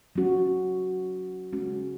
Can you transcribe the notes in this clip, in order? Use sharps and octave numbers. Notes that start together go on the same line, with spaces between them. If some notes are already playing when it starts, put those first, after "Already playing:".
F#3 C#4 F#4
G#3 C#4 F#4